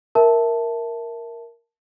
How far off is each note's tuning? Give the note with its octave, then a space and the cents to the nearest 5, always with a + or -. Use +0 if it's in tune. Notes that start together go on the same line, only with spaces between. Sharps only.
A#4 +0 E5 +0 A5 +0